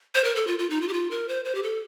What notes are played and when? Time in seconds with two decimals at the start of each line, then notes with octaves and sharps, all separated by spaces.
0.15 C5
0.24 A#4
0.36 A4
0.47 F4
0.59 F4
0.70 D#4
0.82 F4
0.88 G4
0.93 F4
1.11 A#4
1.29 C5
1.45 C5
1.55 G4
1.63 A4